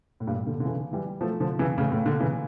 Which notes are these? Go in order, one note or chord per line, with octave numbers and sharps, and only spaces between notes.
A2
G2 A#2
A#2 D3
D3
C#3 E3
E3 G3
F3 A3
D3 F3
C#3 E3
A2 C#3
A2 C#3
A#2 D3
C#3 E3